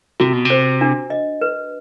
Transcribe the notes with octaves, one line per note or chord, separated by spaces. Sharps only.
C3 F#4
B2
C3
C5
D4
D#5
B4